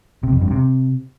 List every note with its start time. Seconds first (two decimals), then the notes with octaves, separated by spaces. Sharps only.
0.23 C3
0.32 F2
0.42 G2
0.51 C3